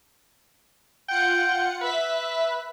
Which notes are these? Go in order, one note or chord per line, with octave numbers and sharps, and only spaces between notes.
F4 F#5 G5 C#7
B4 E5 B6